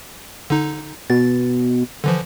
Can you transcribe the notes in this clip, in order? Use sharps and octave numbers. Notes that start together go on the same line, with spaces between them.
D3 D#4
B2 A6
D3 E3 F3